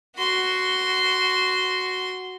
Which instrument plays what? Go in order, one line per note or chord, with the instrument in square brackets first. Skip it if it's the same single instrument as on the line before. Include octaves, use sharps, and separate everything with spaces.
[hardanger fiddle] F#4 C6